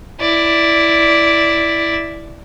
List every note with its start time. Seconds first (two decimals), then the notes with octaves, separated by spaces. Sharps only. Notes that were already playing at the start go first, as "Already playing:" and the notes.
0.20 E4 D5